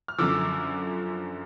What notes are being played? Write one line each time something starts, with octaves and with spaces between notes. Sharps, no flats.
F6
F#2 D3 F3 D6 E6